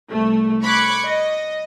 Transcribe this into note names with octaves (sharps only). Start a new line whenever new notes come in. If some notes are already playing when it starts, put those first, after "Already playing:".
C2 A3
B5 C#6 D6 F#6 G#6 C#7
D#5